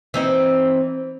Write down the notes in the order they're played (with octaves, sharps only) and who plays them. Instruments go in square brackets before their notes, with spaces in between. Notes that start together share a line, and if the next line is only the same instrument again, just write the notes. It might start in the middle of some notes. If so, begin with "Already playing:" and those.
[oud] E3 C4 D#4